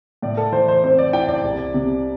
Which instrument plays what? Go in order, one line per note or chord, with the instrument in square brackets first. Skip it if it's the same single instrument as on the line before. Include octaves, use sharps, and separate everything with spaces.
[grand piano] A2 D5
A4
E3 C5
C5
C4 C5
D5
E4 G5
D5
C2
C3